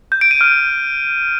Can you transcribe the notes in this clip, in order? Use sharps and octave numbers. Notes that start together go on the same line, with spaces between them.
G6
D7
D#7
F6